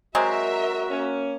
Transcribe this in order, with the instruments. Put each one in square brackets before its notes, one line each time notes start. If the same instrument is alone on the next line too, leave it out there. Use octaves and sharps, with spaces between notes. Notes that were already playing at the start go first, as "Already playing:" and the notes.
[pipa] F#3 G#3 C4 [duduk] F#4 [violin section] A#4 E5
[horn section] A#3 C#4